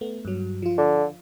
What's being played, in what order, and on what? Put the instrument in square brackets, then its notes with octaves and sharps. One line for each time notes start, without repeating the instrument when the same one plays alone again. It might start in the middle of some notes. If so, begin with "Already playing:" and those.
[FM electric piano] A3 B3
G2 F#3
F3 F4
[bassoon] D3